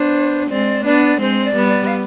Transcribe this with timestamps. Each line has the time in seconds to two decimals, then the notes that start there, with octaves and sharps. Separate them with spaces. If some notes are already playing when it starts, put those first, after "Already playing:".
Already playing: B3 D4 C5
0.50 G#3 C4 D5
0.85 B3 D4 D5
1.20 G#3 C4 C5
1.45 D5
1.56 G3 B3
1.68 D5
1.87 F5